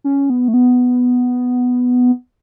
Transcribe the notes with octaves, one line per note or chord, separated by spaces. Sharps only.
C#4
B3
A3
B3